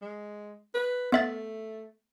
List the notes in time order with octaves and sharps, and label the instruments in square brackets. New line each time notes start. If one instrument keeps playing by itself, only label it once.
[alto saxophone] G#3
B4
[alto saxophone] A3 [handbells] B3 E5 A6